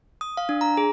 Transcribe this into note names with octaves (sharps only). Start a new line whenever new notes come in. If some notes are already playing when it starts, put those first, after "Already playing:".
D#6
F5
D4
A#5
G#4